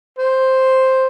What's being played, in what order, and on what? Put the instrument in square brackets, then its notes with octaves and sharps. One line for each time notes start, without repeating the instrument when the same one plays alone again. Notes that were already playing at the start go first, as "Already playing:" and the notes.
[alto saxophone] C5